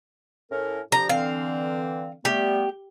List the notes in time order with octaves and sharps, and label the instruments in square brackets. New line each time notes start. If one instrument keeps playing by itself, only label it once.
[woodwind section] A2 C#4 A#4
[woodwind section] D3 F3 G4 [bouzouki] A#5
[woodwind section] D3 E3 C4 [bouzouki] F5
[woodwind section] G3 A3 B3 [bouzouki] G4